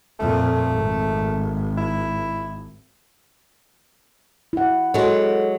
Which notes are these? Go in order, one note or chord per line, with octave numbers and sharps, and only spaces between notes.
F2 A#2 A3
G#1
E4
E4 F#5
F#3 G#3 A4